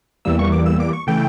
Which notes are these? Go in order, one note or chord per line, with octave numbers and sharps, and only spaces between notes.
E2 E3 G3 A#3 E6
C#6
D6
E6
D6
C#6
C#3 E3 A3 G5